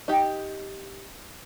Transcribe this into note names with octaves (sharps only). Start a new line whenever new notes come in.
D#4 G4